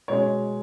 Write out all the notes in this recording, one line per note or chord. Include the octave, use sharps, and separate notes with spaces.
B2 G#3 C#5